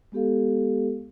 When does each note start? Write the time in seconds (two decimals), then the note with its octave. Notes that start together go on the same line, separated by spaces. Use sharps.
0.12 G#3 B3 G4 A4 F5